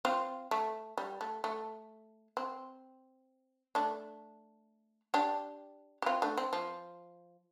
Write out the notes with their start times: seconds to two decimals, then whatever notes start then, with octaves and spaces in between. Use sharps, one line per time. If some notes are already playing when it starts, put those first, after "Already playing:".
0.05 C4 F4
0.51 A3
0.97 G3
1.21 A3
1.44 A3
2.37 C4
3.75 A3 D4
5.14 D4 G4
6.02 G4
6.06 C4 F4
6.22 A3 D4
6.38 C4
6.53 F3